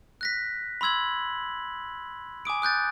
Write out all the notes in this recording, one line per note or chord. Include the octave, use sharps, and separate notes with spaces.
F#6 A#6 B6
B5 C6 E6 G#6 F#7
G#5 D6 D#6 D7
D#6 F#6 G6 A6